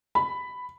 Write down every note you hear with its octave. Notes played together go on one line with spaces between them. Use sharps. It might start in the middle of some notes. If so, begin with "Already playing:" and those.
B5